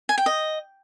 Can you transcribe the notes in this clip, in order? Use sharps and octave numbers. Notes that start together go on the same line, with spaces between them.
G#5
G5
D#5